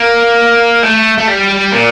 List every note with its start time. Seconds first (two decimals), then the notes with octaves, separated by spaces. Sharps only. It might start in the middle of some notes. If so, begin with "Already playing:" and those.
Already playing: A#3
0.83 A3
1.18 A3
1.28 G3
1.72 A#2